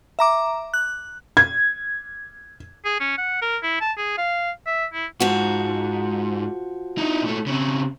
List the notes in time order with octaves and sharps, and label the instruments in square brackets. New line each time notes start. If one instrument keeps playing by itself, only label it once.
[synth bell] E5 A#5 D6
F#6
[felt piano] G#6
[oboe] G#4
C#4
F#5
A#4
E4
A5
G#4
F5
E5
E4
[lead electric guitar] G#2 [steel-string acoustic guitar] F3 F#4
[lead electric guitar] D#4 E4
A#2 A3
C#3 C4